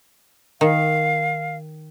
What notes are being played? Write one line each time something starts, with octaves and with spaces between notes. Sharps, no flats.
D#3 F5